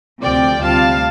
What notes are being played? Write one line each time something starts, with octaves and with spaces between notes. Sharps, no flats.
D2 C3 F3 D5 G5
D2 C3 G3 F4 F5 A5